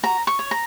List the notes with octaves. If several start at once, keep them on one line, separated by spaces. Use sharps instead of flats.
F#4 A#5
C#6
C#5
A#5